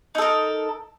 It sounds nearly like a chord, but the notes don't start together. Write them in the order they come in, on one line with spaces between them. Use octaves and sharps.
D#4 A4 A#4